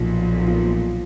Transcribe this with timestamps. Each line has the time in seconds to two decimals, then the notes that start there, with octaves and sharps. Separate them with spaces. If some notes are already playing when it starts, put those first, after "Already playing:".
Already playing: B1 A#2 F3 F4
0.48 F4